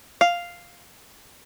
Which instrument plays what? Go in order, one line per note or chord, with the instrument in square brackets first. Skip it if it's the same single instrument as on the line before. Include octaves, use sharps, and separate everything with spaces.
[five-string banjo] F5